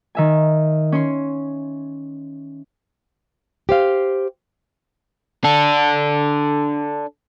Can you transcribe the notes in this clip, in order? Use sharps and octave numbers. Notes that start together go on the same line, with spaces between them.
D#3 E5 G#5
C#4 C#5 C6
G4 C5 F5
D4 A4